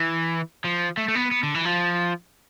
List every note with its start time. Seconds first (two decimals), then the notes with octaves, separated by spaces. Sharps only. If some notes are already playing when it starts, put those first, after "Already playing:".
Already playing: E3
0.64 F3
0.97 A3
1.08 A3
1.15 B3
1.31 B3
1.43 D3
1.54 E3
1.65 F3